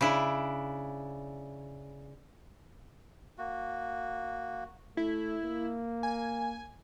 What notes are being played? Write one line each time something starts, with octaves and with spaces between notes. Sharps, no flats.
C#3 D4 E4
A#3 F#4
A3 E4
A#3
G#5